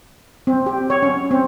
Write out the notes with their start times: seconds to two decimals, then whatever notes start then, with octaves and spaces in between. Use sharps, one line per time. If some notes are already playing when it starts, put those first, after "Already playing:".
0.47 C4
0.66 G4
0.90 C#5
1.03 C#4
1.31 C4